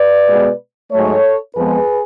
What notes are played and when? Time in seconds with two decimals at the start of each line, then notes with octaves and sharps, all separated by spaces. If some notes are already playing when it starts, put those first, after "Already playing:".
Already playing: B4 D5
0.26 B2 G#3 B3
0.90 G#2 F#3 A3 A4 C#5
1.55 F2 F3 G#3 B3 G#4 B4